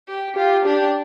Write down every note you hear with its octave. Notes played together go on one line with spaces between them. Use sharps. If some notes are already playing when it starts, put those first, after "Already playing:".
G4
F4 G4
D4 G4